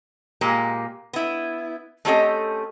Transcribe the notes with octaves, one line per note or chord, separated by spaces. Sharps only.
A#2 G#3 A#3 G4
B3 E4
A3 C4 C#4 G4 A4 D#5